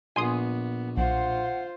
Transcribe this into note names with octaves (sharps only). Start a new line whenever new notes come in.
A#1 B3 G#5 C6 D#6
B1 F4 C5 F#5